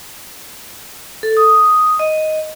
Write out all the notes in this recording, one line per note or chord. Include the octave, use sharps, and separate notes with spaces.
A4
D#6
D#5